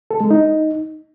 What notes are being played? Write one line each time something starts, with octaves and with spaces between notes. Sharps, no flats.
A4
G#3
D#4